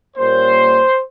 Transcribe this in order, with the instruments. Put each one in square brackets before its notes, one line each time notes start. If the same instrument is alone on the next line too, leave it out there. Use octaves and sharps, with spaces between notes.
[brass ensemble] A#2 G3 A#3 C#4 C5